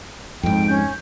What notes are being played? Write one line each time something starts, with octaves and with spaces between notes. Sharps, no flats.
F2 G#2 G5
C#4 G6